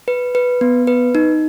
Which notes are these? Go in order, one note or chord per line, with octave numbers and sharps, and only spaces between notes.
B4
B4
B3
B4
D#4